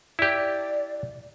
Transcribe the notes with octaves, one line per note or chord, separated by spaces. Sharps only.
E4 G4 D5